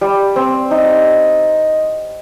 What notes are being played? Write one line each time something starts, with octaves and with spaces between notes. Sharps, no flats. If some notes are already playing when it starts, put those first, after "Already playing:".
G3
C4
D#4